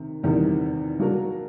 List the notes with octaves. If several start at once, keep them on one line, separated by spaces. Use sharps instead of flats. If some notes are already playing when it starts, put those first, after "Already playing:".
Already playing: C3 D#3
E2 C3 D#3 G3
F#3 A#3 D4 F#4 A#4